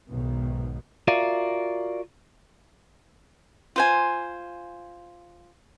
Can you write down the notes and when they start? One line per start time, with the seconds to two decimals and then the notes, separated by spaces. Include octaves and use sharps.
0.10 B1 G#2 B2 D#3
1.08 F4 F#4 A#4 D5 E5 F5
3.76 F4 C5 G#5